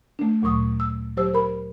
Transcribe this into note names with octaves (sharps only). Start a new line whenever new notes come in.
A3 D4
D2 A#2 F#3 C#6 D#6
E6
F#3 G4 C5 E6
A#4 B5